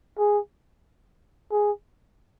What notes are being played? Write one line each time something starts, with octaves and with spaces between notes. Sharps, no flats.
G#4
G#4